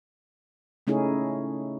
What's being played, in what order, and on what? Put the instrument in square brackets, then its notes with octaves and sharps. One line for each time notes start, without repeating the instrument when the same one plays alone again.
[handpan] C#3 A3 C#4 D#4 E4 G#4